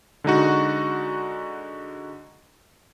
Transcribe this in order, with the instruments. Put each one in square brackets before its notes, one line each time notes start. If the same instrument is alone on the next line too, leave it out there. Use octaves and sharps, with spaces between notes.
[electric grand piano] D3 G#3 D#4 F#4